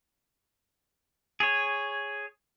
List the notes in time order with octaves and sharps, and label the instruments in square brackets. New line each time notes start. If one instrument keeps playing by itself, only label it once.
[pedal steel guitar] G#4 C#5